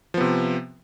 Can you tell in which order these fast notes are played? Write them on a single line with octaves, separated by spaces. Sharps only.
F3 B3 C3